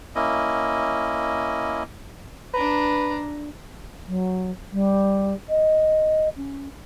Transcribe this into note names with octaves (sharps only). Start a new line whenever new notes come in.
A#3 C#4 E4 D#5
D4 B4 A#5
F#3
G3
D#5
C#4